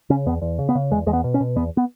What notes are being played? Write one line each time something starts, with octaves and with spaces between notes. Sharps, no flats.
C#3 C#4
E2 B3
E2
C#3
B3
C#3
E2 G#3
E2 G#3
B3
B2
C#4
B2
E2 B3
B3